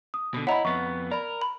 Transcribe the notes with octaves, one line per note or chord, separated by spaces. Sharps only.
D#6
B2 D3
E4 C#5 D#5 F#5 A#5 B5
F2 B3 C#6
A#4 D5 A#5 B5
B5